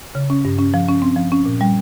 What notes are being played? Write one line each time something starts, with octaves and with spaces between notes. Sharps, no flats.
C#3
C#4
G2
C#4
F3
C#4
C4
F3
C#4
A#2
G3